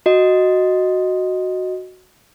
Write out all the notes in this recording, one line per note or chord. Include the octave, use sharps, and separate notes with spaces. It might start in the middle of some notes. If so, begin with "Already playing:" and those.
F#4 D#5